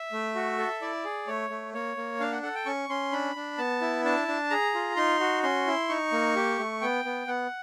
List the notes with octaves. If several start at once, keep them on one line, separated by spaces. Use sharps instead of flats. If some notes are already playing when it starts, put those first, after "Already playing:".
Already playing: E5
A3
F#4
A4
E4 D5
G#4
A3 C#5
A3
A#3 C#5
A#3
D4 F5
F#5
A4 F#5
G5
C#4 C#6
C#4 C6
D4 B5
D4
B3 A5
E4
D4 A5
D4
G#4 A#5
F4
D#4 C6
F#4
C#4 C6
E4
D#4 C#6
A#3
G4
A3
B3 G5
B3
B3 F#5